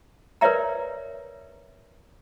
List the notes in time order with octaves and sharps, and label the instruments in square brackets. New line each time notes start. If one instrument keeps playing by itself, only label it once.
[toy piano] A#4 B4 C#5 D5 E5 A#5